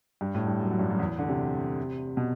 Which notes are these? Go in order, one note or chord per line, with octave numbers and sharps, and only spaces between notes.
G2
A2
G2
F#2
F#2
G2
F#2
E2
D3
C3
B2